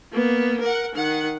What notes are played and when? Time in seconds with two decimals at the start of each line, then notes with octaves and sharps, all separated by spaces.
0.12 A#3 B3
0.61 A#4 F#5
0.95 D#3 F#5